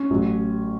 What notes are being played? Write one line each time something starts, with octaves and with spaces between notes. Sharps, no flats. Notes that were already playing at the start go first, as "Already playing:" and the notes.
Already playing: C#4
A1 A2 F#3